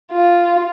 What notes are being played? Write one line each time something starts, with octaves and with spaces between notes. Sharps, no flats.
F4